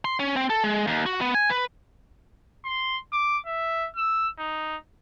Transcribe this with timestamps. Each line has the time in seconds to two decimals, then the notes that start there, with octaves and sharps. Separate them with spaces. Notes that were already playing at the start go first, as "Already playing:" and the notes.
0.05 C6
0.20 C#4
0.36 C4
0.50 A4
0.64 G#3
0.87 D#2
1.06 F#4
1.21 B3
1.35 G#5
1.50 B4
2.65 C6
3.13 D6
3.47 E5
3.97 E6
4.39 D#4